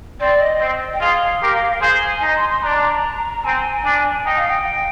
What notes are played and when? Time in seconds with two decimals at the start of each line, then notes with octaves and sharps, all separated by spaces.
0.20 C4 D5
0.41 D#5
0.61 C4
0.94 G5
1.00 F4 G#4 F5
1.42 G4 A#4
1.82 G#4 C5 G#5
2.22 D#4 A#5
2.37 C6
2.49 C6
2.63 D4 A#5
3.45 C4 G#5
3.84 D4
4.26 D#4 G5
4.38 F5
4.50 G5